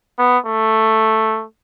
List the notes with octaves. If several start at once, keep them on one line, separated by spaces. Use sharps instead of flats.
B3
A3